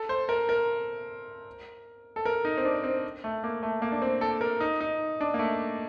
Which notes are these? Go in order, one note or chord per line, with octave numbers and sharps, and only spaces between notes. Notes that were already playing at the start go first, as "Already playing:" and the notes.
Already playing: A4
C5
A#4
A#4
A4
A#4
D#4
C4
D4
C4
A3
A#3
A3
A#3
D4
C4
A4
A#4
D#4
D#4
D4
A#3
A3